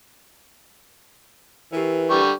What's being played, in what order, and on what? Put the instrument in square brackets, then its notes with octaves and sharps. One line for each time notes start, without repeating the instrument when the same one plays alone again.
[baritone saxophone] E3 [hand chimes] G4 A#4 B4
[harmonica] D3 G3 C#6